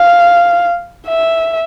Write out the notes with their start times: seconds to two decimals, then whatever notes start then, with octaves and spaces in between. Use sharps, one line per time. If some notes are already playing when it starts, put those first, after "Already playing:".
Already playing: F5
1.07 E5